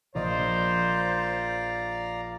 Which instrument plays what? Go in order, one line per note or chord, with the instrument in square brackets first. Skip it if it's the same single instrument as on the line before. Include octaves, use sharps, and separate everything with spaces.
[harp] A#1 A#4 D#5 [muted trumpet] C5 [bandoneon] D5 F5 A#5